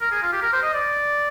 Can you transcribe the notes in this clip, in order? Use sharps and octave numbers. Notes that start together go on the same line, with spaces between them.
A#4
G#4
F4
G4
A#4
C5
D#5
D5